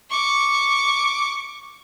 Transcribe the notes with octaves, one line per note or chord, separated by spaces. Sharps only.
C#6 D6